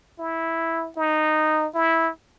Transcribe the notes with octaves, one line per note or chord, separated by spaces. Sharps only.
E4
D#4
E4